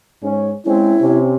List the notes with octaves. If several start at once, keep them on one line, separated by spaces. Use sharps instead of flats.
G#2 C#4
G#3 C4 C#4 E4
C3 C4 C#4